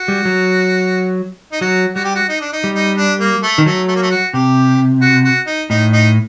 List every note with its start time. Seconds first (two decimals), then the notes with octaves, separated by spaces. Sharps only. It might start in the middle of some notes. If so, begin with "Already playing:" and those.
Already playing: F#4
0.08 G3
0.25 F#3
1.52 D#4
1.61 F#3 F#4
1.95 G3 F#4
2.05 G4
2.15 F#4
2.29 D#4
2.41 D4
2.53 D#4
2.64 G3
2.75 D#4
2.97 D4
3.20 A#3
3.43 A3
3.58 D#3
3.66 F#3 A3
3.88 A3
3.96 A#3
4.03 A3
4.11 F#4
4.34 C3 G4
5.02 F#4
5.24 F#4
5.47 D#4
5.70 A2 D#4
5.93 D#4